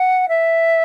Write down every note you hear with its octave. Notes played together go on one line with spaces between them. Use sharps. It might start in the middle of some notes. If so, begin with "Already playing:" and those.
Already playing: F#5
E5